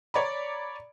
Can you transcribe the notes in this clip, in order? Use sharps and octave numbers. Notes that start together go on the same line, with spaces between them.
C#5 D5 A#5 B5